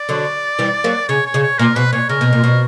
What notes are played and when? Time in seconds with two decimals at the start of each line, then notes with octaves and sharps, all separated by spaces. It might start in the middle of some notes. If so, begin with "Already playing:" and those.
Already playing: D5
0.09 D3 F#3
0.59 E3 G3
0.84 F#3 A#3
1.09 C#3 C#5
1.26 C#5
1.34 C#3
1.43 C#5
1.59 A#2 A#4
1.76 B2 B4
1.93 A#2 C#5
2.09 C#3 A#4
2.21 B2
2.33 A#2
2.44 B2